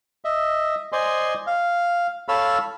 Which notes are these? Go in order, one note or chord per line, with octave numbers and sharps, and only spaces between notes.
D#5 E5
C5 D5 D#5 G#5 C6
F5
A4 C#5 F5 B5 E6 F6